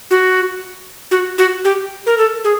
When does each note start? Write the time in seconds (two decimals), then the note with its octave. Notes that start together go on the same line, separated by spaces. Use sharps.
0.11 F#4
1.11 F#4
1.38 F#4
1.65 G4
2.06 A#4
2.18 A4
2.44 G#4